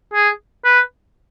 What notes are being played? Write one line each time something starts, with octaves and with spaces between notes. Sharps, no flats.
G#4
B4